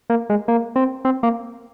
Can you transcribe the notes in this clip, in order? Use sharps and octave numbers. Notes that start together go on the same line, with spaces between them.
A#3
G#3
A#3
C4
C4
A#3